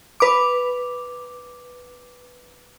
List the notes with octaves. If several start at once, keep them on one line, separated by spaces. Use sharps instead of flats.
B4 D6